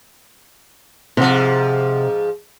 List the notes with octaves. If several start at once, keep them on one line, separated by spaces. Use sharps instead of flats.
G#2 C3 F3 F#5